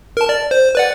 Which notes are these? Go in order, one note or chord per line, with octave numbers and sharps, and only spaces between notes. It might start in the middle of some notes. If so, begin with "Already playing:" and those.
A#4 A5
D5
C5
B4 D5 F#5